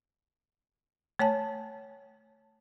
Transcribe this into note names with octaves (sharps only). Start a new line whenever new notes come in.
A3 C#5 G#5 A5